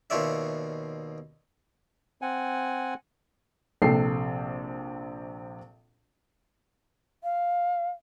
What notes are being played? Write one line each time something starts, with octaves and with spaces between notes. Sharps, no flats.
D#2 B2 F4 C#5 D5 E5
C4 F#5 G#5
A#1 C3 A4 G5 C7
F5